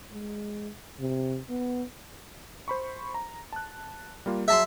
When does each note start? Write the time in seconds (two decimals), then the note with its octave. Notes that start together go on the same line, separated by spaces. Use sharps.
0.12 G#3
1.00 C3
1.50 B3
2.68 C5 B5 C#6
3.14 A#5
3.53 A5 F#6
4.26 G3 A#3 F4
4.48 F#3 G#4 E5 A5 C6